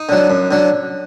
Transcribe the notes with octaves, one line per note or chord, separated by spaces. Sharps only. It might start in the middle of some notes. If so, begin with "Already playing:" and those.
Already playing: D#4
D3 F#3
F#2
D3 F#3